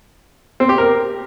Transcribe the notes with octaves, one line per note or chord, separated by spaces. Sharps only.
C4
G4
A#4